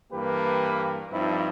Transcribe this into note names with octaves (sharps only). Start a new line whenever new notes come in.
G2 E3 A#3 G4 B4
G2 F3 C4 D#4 E4